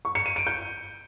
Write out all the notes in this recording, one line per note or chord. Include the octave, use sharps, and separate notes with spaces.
C#6
C#7
D#7
D7
G6